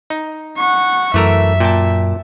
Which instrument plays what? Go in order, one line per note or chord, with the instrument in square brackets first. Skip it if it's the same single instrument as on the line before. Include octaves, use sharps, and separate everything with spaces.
[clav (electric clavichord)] D#4
[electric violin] F#5 C#6
[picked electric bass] F#2 [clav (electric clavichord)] E3 A3 A#4 [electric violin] E5
[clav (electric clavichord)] A#2 G5 A5